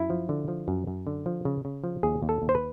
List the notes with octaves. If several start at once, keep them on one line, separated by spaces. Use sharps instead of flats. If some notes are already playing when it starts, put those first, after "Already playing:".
Already playing: F#2 E4
F3
D3
F3
F#2
F#2
D3
F3
C#3
C#3
F3
D#2 G#4
D#2
A4
D#2
C5
B4